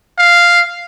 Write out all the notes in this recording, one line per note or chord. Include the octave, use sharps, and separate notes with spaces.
F5